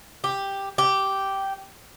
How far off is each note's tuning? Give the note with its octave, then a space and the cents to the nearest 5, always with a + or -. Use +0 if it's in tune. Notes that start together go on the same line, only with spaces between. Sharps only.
G4 +5
G4 -10